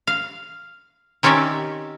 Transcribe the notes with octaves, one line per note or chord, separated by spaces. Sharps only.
F5
D#3 C4 C#4 G4 D5 E5